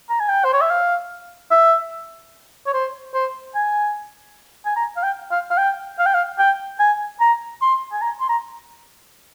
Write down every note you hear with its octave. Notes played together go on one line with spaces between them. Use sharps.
A#5
G#5
G5
C5
C#5
E5
F5
E5
C#5
C5
C5
G#5
G#5
A#5
F5
G5
F5
F5
G5
F5
G5
F5
G5
G#5
A#5
C6
G#5
A#5
C6
A#5